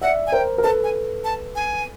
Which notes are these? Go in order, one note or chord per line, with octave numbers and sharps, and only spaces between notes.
D5 E5 F#5
G#5
A#4 C5 G5
A#4
A4 B4 A5
G#5
A5
G#5